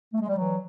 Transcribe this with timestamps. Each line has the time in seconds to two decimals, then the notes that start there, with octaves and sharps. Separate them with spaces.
0.14 A3
0.21 G#3
0.28 G3
0.37 E3 F#3